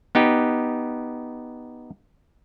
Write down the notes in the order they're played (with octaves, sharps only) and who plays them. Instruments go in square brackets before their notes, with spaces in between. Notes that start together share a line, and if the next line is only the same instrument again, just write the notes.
[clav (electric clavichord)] B3 D#4 G4 B4